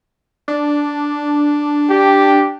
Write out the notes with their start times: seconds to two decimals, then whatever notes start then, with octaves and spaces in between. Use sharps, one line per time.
0.48 D4
1.90 G4